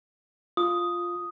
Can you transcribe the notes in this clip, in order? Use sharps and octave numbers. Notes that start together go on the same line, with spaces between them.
F4 D#6